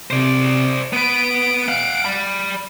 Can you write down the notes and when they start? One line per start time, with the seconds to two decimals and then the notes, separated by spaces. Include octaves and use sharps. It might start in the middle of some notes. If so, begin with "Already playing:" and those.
0.11 C3 C5 D5
0.93 B3 B4 D7
1.68 F5 F#5
2.05 D5 B5